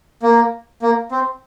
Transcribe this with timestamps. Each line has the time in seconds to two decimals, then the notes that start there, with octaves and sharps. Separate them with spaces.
0.22 A#3
0.82 A#3
1.11 C4